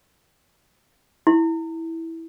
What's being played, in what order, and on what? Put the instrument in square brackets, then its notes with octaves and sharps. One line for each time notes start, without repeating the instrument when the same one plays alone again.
[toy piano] E4